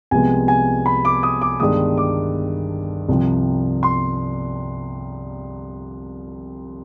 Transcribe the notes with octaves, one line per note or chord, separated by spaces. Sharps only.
C2 C3 F3 G#3 B3 G#5
G#5
B5
D6
D#6
D6
G1 G2 D#3 G#3 D#6
D6
C2 C3 F3
C6